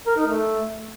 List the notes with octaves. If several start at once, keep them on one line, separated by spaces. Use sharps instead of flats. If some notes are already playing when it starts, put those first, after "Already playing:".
A#4
D#4
A3